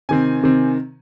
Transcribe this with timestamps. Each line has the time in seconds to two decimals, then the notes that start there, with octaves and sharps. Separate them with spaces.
0.09 C3 D#3 C4 G#5
0.43 C3 D#3 C4